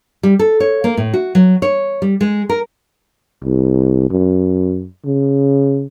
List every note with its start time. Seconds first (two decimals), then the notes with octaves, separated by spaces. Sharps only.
0.23 G3
0.39 A4
0.60 C#5
0.84 A#3
0.97 A2
1.14 F#4
1.35 F#3
1.62 C#5
2.02 G3
2.21 G#3
2.49 A#4
3.44 C2
4.10 F#2
5.05 C#3